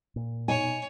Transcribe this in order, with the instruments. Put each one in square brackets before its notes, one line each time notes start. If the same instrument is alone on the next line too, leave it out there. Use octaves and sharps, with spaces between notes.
[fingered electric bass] A#2
[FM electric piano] B2 D#4 [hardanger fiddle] C#5 [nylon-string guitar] G#5